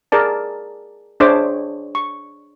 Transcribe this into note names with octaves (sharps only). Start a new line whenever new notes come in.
G#4 A#4 D5 A5
D4 G#4 C5 C#5 E5 D6
C#6